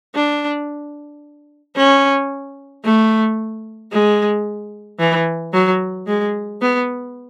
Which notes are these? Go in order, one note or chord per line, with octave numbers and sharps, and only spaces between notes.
D4
C#4
A3
G#3
E3
F#3
G#3
B3